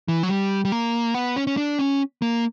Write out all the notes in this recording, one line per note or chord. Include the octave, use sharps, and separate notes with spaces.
E3
F#3
G3
G3
A#3
B3
C#4
C#4
D4
C#4
A#3